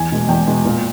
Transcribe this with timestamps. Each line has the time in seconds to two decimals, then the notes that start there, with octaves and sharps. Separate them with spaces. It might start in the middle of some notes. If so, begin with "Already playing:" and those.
Already playing: E2 G#5
0.12 B2 G#3
0.29 E2 G5
0.47 B2 G#3
0.65 A#2